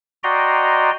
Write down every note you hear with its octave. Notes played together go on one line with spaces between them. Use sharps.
F#4 D5 D#5 G5 A#5 C6